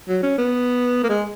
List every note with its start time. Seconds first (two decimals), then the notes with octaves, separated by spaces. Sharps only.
0.09 F#3
0.23 C#4
0.38 B3
1.04 A#3
1.09 G#3